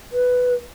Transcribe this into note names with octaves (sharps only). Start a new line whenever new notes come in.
B4